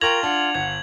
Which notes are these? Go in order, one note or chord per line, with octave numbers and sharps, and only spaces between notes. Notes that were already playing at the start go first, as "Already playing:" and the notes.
F4 A#4 G5 C#6 G#6 A#6 F7 F#7
D4 F#5
G1 G#6 F7